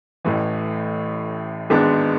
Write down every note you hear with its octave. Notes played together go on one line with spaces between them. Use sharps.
A1 A2 E3
G#1 G#2 G#3 B3 D4